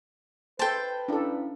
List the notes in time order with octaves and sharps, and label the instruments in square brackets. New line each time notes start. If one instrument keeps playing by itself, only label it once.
[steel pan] A4 C5 [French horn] B4 [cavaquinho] G5 A5
[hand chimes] C#4 E4 F5 [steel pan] D4 A4